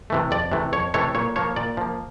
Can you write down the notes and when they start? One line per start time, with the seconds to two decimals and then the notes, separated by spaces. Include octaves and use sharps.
0.10 C3 E3 A3
0.31 F2 D5
0.52 C3 E3 A3
0.73 F2 C#5
0.94 C3 E3 A3 C#5
1.15 A#2 C#5
1.36 F3 A#3 C#5
1.56 A#2 D5
1.77 F3 A#3